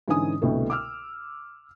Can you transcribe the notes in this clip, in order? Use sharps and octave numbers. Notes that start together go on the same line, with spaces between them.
G#2 D3 E3 C#4 G#5 D#6
C2 B2 D3 A3
D6 E6 F6